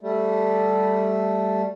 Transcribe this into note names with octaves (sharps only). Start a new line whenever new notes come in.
G3 A3